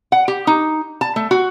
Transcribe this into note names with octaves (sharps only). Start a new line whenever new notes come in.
F#5
G4
D#4
A5
A3
F#4